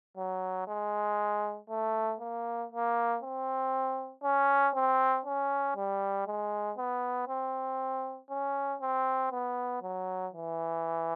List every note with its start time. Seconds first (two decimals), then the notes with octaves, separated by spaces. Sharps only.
0.17 F#3
0.68 G#3
1.70 A3
2.20 A#3
2.72 A#3
3.23 C4
4.24 C#4
4.75 C4
5.26 C#4
5.76 G3
6.27 G#3
6.78 B3
7.28 C4
8.30 C#4
8.81 C4
9.32 B3
9.83 F#3
10.33 E3